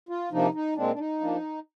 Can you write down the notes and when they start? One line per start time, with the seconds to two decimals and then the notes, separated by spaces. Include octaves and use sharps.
0.09 F4
0.32 C3 F3 A#3 D4 D#4
0.54 D#4
0.76 A#2 G#3 C4 D4
0.94 D4
0.99 D#4
1.21 F3 A#3 D4